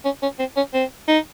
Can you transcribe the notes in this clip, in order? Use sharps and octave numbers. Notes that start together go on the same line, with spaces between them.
C#4
C#4
C4
C#4
C4
D#4